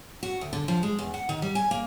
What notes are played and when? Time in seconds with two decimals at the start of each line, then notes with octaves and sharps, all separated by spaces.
0.23 F#4
0.41 D2
0.53 D3
0.68 F3
0.83 G#3
0.99 E2
1.14 F#5
1.29 D#3
1.42 G3
1.55 G#5
1.71 A#3